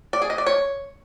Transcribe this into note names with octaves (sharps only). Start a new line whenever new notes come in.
D5
G#4
D#5
D5
C#5